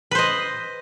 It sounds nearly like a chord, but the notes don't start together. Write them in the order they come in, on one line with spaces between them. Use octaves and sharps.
B4 C5 D#5